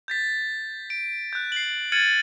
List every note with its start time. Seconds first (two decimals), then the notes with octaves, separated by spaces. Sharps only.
0.08 G6 A6 B6
0.90 D7
1.33 F#6 G6
1.52 C7 F#7
1.92 F6 G#6 A6 C#7 D#7 F#7